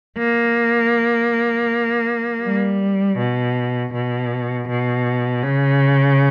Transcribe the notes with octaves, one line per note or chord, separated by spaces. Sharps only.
A#3
G3
B2
B2
B2
C#3